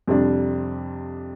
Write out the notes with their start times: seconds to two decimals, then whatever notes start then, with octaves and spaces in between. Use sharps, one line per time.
0.08 F2 C3 G3 D4